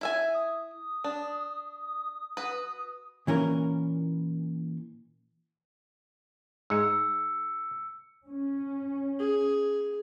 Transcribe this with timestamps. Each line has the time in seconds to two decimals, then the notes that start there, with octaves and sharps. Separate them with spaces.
0.01 E4 E5 G#5
0.34 D#6
1.04 D4
2.37 F#4 B4
3.27 A#2 E3 C#4 A#4
6.70 G#2 G#3 E6 C#7
8.26 C#4
9.19 G#4